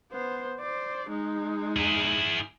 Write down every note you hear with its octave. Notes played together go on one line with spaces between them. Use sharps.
B3 C5
C5 D5
G#3 D#4
E4 G#4